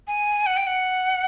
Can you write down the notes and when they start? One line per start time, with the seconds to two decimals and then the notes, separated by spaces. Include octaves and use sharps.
0.07 G#5
0.46 F#5
0.57 G5
0.67 F#5